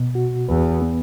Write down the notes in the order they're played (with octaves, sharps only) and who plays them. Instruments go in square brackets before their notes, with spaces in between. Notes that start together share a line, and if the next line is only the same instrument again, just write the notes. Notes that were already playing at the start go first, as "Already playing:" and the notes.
Already playing: [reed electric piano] B2
F#4
[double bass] E2 [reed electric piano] B4
[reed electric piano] B3